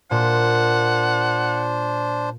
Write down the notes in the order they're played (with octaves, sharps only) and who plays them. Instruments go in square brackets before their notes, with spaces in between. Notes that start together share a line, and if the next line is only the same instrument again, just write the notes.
[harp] A#2 [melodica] D4 C5 [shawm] F#5